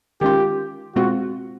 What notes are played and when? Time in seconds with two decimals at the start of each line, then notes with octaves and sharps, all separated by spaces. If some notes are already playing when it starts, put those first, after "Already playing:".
0.21 D#3 G#3 C#4 F4 G4
0.96 B2 G#3 C4 F4 F#4